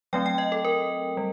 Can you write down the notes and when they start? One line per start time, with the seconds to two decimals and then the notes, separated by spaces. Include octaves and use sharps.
0.13 F#3 A3 C4 G5
0.26 G5
0.38 D#5
0.52 A4
0.65 A#4
1.17 G3